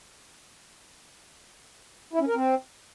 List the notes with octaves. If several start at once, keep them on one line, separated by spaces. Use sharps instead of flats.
E4
C#4
A#4
C4